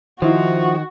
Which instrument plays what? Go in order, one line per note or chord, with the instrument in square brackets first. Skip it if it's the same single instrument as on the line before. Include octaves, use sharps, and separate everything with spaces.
[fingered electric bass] D#3 [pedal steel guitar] F3 [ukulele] D#4 E4 C5 [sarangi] F#4